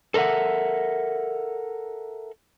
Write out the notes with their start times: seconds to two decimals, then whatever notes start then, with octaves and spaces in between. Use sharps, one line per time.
0.14 A4 A#4 D5 E5 F#5